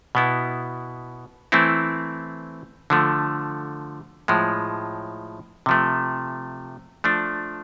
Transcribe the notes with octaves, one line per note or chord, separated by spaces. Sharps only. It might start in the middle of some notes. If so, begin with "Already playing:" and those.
B2 B3 E4
E3 A3 C4 E4
D3 F3 A3
A2 F3 G#3
C3 F3 A3
F3 A3 D4